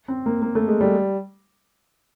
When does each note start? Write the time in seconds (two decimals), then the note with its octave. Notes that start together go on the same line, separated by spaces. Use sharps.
0.08 C4
0.26 A#3
0.42 A#3
0.55 A3
0.68 G#3
0.81 G3